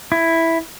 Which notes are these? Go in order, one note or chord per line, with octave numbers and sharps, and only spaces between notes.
E4